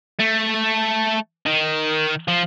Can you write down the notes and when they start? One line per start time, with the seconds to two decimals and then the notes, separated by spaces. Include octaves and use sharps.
0.19 A3
1.46 D#3
2.28 F3